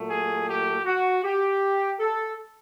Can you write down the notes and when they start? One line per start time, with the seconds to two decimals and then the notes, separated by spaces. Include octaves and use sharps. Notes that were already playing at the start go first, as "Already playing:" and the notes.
Already playing: A#2 F#3 A3
0.10 G#4
0.48 G4
0.86 F#4
1.24 G4
2.00 A4